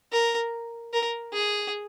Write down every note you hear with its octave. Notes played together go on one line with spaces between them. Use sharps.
A#4
A#4
G#4